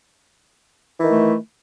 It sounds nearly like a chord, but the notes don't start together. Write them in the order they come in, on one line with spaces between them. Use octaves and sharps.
E3 D#3 A3